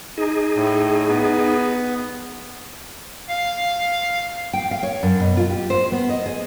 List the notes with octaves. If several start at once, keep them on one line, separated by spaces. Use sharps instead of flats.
D#4 G#4
A2
B3
F5
G5
F5
C#5
F#2
B2
F4
G4
C5
B3
D#5
G#4